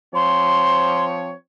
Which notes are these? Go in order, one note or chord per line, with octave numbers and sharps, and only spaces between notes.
F3 C4 C#5 C6